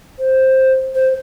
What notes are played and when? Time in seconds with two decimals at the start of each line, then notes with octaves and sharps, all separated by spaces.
0.19 C5
0.95 C5